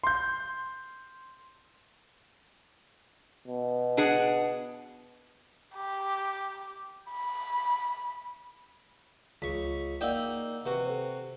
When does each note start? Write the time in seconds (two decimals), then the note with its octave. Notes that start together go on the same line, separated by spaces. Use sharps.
0.04 C6 G6
3.48 B2
3.97 D4 G#4 F#5
5.76 G4
7.10 B5
9.42 C#2 C#6 B6
10.01 A#3 D#4 D5 F#5 G5 E6
10.66 C3 F#4 B4
10.86 A4 C5